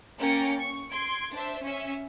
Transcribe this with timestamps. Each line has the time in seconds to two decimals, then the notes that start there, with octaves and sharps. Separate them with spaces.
0.18 A#3 C#4 G5 A#5 A6 C#7
0.59 C#6
0.92 C6 G#6 D7
1.32 D4 C5 E5
1.63 C#4 E5